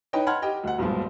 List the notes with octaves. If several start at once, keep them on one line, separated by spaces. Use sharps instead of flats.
D#4 B4 C#5 D#5 G5
F#5 A5 B5 C6 F6 G#6
G4 D#5 G5
D2 F#5
B1 G2 A#2 F3 G#3